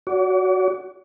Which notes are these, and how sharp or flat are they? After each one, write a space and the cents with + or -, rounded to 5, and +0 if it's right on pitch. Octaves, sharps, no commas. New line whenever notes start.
F#4 +0 D5 -40